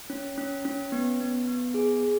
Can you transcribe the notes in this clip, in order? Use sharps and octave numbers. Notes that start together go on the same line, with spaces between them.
C#4
C#4
C#4
B3
B3
B3
G#4
G#4